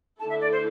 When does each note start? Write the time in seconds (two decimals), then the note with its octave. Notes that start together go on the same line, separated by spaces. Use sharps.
0.19 D3 A3 E4 A4 A5
0.29 E5
0.41 D5
0.52 C5